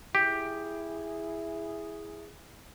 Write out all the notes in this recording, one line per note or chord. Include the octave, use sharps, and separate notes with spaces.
E4 G4 G#4